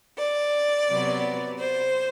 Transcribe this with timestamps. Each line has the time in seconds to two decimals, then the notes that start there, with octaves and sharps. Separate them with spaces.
0.18 D5
0.89 C3 F#3 B3
1.60 C5